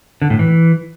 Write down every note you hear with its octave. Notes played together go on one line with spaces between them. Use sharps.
D3
A2
E3